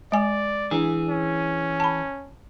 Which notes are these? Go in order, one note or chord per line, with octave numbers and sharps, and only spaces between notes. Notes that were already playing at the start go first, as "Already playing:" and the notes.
G#3 D5 G#5
E3 D4 G#4
C#4
A5 B5